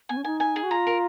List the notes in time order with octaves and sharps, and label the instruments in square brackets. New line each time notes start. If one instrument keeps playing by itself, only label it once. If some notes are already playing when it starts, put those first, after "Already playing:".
[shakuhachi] B3 [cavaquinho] G#5
[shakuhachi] C#4
[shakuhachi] D#4 [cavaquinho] G#5
[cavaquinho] G#5
G#4
[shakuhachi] F#4
[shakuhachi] F4 [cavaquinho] A#5
[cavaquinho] A#4